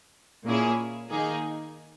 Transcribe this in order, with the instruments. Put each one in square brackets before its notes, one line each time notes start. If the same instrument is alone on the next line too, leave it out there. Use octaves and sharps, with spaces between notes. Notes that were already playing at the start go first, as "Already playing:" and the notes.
[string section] A#2 A#3 C#4 E4 G#4
D#3 A#3 D#4 G#4